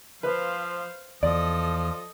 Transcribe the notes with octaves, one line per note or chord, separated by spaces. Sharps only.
F3 B4 C5 F5
E2 F3 A4 D5 D#5